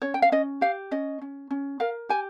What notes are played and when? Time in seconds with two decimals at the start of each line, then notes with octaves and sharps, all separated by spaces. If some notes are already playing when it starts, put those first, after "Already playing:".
0.02 C#4 C#5
0.14 G5
0.22 F5
0.32 C#4 D#5
0.61 G4 F5
0.91 C#4 D#5
1.22 C#4
1.51 C#4
1.80 A#4 F5
2.09 G4 G#5